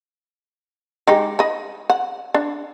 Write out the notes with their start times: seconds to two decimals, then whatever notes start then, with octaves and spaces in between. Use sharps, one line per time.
1.07 G#3 D#4 G4
1.39 D#5 B5
1.90 F#5
2.34 D4